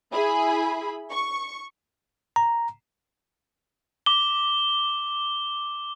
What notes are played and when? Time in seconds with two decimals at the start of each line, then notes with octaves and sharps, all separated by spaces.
0.12 E4 G#4 B5
1.10 C#6
2.36 A#5
4.06 D6 G7